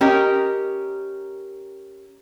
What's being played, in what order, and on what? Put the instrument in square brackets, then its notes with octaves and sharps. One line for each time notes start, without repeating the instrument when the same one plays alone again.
[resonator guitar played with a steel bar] C#4 G4 A#4 D#5